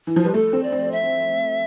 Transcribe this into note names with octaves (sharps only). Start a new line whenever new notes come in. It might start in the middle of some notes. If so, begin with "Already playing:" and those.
E3
F3
G3 B4
A3 A4
C4
D5
C4
E5